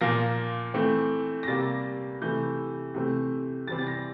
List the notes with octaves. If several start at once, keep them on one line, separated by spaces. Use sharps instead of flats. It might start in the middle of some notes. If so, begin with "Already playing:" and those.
A#2 F3 A#3 A#6
E3 A3 C4
A#6
C3 G3 A#3 A6
C3 E3 A3 G6
C3 E3 A3 C4
C3 E3 G3 C4 A6
A6
A#6